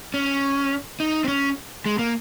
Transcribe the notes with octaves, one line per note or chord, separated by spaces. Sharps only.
C#4
D#4
C4
C#4
G#3
A#3